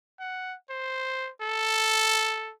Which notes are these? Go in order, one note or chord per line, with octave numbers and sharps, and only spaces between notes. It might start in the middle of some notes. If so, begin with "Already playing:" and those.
F#5
C5
A4